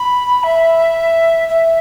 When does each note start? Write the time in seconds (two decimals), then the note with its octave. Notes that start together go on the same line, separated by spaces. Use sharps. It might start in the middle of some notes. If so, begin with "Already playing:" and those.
Already playing: B5
0.43 E5
1.49 E5